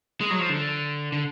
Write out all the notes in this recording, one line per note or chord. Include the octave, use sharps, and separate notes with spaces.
G#3
F#3
F3
D3
D3